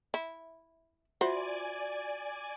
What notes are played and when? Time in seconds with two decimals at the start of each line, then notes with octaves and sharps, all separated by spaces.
0.14 E4
1.21 F4 F#4 C5 D5 E5 F#5 G#5